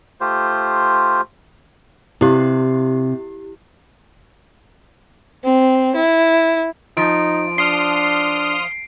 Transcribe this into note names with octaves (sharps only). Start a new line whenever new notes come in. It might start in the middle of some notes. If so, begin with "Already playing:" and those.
A3 F4 G4 C5
C3 E4 G4
C4
E4
F3 D#4 D7
D4 C6 D#6 F6 C7